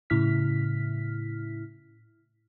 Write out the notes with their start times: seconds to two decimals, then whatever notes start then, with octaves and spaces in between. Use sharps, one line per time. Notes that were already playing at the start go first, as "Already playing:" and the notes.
0.10 A2 C#3 E4 F6 B6